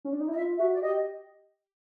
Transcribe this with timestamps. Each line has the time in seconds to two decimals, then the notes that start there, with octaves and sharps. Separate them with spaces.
0.05 C#4
0.13 D4
0.20 D#4
0.28 E4
0.32 D#5
0.36 F4 E5
0.59 F#4 E5
0.73 D5
0.82 G4 D#5